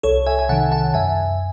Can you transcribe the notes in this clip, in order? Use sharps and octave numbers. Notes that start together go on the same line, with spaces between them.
C2 A4 C#5
E5 G#5
G#5
C3 D#3 F#5 A5
F#5 A5
F#2 E5 G#5